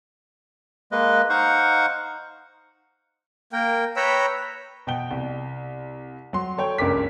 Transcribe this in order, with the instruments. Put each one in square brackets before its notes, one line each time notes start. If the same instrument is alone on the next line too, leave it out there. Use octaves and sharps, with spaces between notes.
[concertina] G#3 A#3 B4 D#5
D#4 C5 F5 F#5 C#6
[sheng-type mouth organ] A#3 A#4 G5
B4 C#5 G5 A#5 B5 E6
[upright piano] B2 G5 G7
C2
F#3 C6
A4 C#5 G5
F#1 C#2 G2 A#4 D6 B6